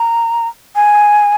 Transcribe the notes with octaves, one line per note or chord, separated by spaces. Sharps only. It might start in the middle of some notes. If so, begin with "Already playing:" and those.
Already playing: A#5
G#5